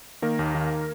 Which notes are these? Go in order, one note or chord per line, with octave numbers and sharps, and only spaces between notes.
D#3 A#3 A#4
D#2
D#3